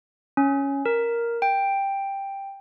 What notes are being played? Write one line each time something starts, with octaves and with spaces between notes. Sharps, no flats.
C#4
A#4
G5